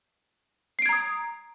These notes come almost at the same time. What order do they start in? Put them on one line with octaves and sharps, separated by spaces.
C7 D7 G#6 A#5 D#6